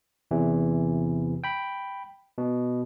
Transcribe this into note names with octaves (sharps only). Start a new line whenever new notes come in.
E2 C3 E3
G5 B5
B2